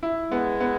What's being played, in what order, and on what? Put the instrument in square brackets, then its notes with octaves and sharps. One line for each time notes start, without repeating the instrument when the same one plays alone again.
[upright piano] E4
[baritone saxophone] G#3 [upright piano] B3
[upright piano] B3